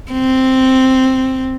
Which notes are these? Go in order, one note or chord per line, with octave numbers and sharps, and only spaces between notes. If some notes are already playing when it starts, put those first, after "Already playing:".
C4